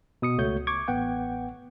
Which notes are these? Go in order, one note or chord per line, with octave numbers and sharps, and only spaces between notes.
B2 D#6 C#7
C#2 A3 F#4 C#5 G6
C#6 D6 G#6
A1 B3 F#5 G5